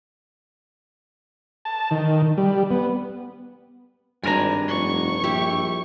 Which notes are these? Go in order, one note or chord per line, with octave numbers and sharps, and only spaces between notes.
A5
D#3
G3
B3
G#1 G2 D4 A#4 G#5 A#5
F1 C#6
A#1 E4 G4